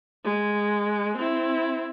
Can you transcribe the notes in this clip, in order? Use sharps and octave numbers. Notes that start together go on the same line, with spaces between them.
G#3
C4 E4